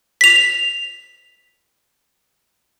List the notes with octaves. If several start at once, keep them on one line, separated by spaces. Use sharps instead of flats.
B6 F7